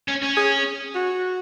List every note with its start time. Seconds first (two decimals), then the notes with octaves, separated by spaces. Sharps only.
0.08 C#4
0.22 C#4
0.37 G#4
0.95 F#4